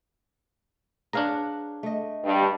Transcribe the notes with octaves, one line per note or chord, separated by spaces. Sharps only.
D4 G#4 B4 C#5 F5 A#5
A3 D#5
G2